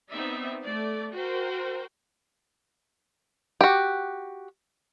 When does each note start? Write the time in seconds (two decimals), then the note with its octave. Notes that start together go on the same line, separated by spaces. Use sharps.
0.11 B3 C4 D#4 D5 E5
0.62 A3 D5
1.15 F#4 A#4 C5 G5
3.61 F#4 G4